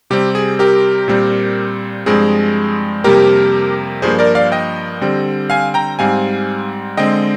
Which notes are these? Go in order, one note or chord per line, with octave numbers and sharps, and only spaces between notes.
C3 G3 C4 G4
G#4
G4 A#4
A#2 G3 C4
G2 F3 G#3 C4 G#4
F2 C3 G3 A#3 G4 A#4
G2 F3 A#3 G#4 C5
A#4 D5
D5 F5
D#5 G5
D3 G3 C4
F5 G#5
G5 A#5
G#2 G3 C4 F5 G#5
D3 G#3 C4 D#5 G5